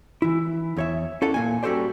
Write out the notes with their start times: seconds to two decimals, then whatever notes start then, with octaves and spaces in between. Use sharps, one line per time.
0.22 E3 E4
0.77 E2 C#5 E5
1.22 C#4 E4 A4 D5 F#5
1.34 A#2 A#3 G#5
1.63 G3 C#4 F#4 A4 C5 D5